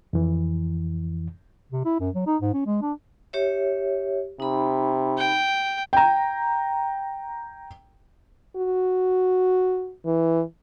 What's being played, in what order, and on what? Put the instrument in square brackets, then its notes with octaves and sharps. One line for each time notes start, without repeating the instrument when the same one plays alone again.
[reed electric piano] F2 E3
[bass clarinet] C3
E4
F#2
F#3
D#4
G#2
C#4
G#3
D4
[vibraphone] G4 C#5 E5
[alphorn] C3 [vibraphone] D#4 B5
[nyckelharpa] G5
[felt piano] G5 A#5
[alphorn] F#4
E3